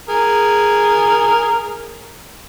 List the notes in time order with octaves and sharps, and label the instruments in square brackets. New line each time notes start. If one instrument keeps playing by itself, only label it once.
[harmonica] G#4 A#4